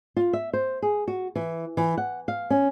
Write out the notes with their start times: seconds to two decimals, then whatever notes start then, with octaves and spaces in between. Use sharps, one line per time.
0.16 F4
0.33 E5
0.53 C5
0.82 G#4
1.08 F#4
1.36 E3
1.77 E3
1.97 F#5
2.28 F5
2.50 C#4